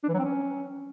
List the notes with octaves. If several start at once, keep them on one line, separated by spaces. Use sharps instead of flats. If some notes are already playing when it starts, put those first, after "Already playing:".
D4
E3
F#3
C4
C#4